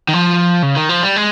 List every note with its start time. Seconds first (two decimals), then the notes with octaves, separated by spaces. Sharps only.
0.09 D#3
0.13 F3
0.63 C#3
0.76 D#3
0.89 F3
1.03 G3
1.16 G#3